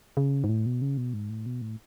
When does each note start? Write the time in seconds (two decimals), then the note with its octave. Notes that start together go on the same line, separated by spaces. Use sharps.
0.17 C#3
0.44 G#2
0.49 A2
0.66 B2
0.82 C#3
0.97 B2
1.14 G#2
1.30 A2
1.46 B2
1.62 A2